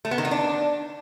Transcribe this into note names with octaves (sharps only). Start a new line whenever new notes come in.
A3
B3
D#3
D#4
D4